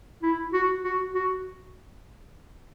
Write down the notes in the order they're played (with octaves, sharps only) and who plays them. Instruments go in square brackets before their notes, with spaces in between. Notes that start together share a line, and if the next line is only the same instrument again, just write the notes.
[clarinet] E4
F#4
F#4
F#4